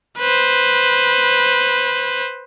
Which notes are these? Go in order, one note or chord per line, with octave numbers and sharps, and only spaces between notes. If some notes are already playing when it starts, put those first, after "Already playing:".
B4 C5